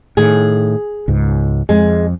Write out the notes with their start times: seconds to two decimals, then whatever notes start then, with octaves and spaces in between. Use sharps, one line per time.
0.17 A2 D#3 G#4
1.08 C#2 G#2
1.69 F2 G#3